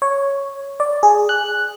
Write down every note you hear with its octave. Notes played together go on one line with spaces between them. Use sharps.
C#5
D5
G#4
F#6